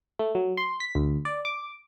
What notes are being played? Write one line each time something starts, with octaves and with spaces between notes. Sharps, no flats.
A3
F#3
C6
B6
D2
D5
D6